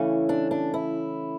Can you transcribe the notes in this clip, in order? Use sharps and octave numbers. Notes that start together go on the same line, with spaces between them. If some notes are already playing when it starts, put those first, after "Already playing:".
Already playing: C#3 E3 A3 C#4
D4
D4
E4